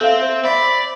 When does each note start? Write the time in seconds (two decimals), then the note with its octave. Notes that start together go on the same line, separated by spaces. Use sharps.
0.01 C4 A4 E5 F5
0.21 C5
0.45 D5 E5 B5